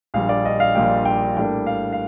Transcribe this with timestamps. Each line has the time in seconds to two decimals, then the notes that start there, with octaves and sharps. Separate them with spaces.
0.14 A#1 A#2 G3 D4 F5
0.29 D5
0.45 D#5
0.60 F5
0.75 A#1 A#2 G3 D4 G5
1.05 G5
1.36 A2 G3 A#3 D4 G5
1.66 F5
1.93 F5